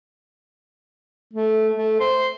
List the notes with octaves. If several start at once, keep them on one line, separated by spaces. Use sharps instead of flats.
A3
A3
C5